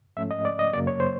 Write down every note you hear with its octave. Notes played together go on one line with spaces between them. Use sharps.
G#2 F3 A3 C#4 E5
D#5
D5
D#5
F#2 C#3 F#3 A#3 D5
C#5
C5